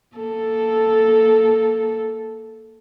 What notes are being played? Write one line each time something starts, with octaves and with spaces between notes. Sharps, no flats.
A#3 A4